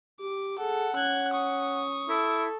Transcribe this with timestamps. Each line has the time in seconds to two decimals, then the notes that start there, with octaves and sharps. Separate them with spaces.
0.20 G4 D6
0.59 G#4 A4 F#5
0.96 C#4 F#6 G#6
1.34 C#6 D#6
2.09 E4 A4